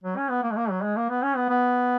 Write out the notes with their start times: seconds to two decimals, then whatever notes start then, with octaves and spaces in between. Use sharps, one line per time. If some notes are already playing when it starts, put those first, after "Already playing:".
0.03 F#3
0.17 C#4
0.30 B3
0.43 A#3
0.51 G#3
0.57 A#3
0.70 F#3
0.83 G#3
0.97 A#3
1.10 B3
1.23 C#4
1.36 B3
1.49 B3